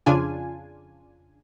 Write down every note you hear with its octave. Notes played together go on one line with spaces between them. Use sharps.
F2 C#3 D4 F4 G#5